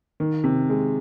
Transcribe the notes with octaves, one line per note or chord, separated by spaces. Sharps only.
D#3
C3
G#3